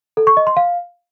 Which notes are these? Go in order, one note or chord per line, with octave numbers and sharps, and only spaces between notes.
A4
C#6
D#5
C6
F5